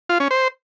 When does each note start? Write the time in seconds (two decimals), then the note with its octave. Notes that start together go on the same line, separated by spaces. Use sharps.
0.09 F4
0.20 C#4
0.31 C5